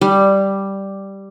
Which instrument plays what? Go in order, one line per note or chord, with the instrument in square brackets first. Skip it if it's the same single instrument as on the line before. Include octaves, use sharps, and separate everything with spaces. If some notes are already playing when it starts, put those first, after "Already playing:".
[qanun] G3